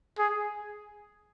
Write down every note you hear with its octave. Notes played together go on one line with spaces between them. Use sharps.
G#4